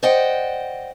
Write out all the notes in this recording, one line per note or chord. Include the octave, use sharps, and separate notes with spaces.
C5 D5 D#5 F#5 G5